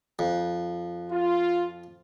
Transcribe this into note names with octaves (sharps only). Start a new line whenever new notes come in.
F2
F4